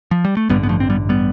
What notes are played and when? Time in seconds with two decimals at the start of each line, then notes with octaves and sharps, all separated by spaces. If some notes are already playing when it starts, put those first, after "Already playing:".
0.11 F3
0.25 G3
0.37 A3
0.49 A1 G2 D3 G3 B3
0.63 B3
0.69 F3 A3
0.80 C4
0.90 G3 B3
1.09 G3 B3